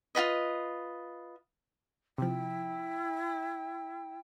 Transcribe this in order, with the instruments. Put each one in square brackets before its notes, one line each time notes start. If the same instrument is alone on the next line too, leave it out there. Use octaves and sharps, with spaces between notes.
[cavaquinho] F4 F#4 B4 D#5
[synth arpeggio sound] C3 F3 [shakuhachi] E4 [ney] G5